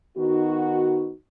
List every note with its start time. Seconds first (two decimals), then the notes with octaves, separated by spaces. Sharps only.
0.15 D#3 B3 D#4 F#4